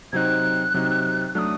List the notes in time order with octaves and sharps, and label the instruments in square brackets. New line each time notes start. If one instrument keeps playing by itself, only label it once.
[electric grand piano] C3 F#3 C4 D#4 [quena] F#6 G#6
[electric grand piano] C3 F#3 C4 D#4
[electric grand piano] F#3 A3 D4 [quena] D#6 F#6